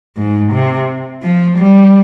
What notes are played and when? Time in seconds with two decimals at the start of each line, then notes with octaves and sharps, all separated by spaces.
0.17 G#2
0.52 C3
1.23 F3
1.58 G3